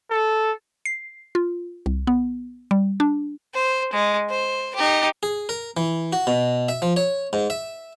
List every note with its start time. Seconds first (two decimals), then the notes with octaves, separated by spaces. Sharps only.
0.11 A4
0.85 C7
1.35 F4
1.86 C2
2.07 B3
2.71 G3
3.00 D4
3.54 C5
3.93 G#3
4.30 C5
4.76 D#4 G4
5.23 G#4
5.49 A#4
5.77 E3
6.13 F#4
6.27 B2
6.69 E5
6.82 F3
6.97 C#5
7.33 G#2
7.50 E5